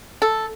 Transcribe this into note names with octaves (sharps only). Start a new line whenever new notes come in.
A4